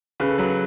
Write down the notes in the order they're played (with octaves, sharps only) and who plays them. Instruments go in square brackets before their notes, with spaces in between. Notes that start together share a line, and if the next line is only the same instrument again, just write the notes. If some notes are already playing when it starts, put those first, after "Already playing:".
[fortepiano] C#3 [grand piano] B4
[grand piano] A4
[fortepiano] F#3 [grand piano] B4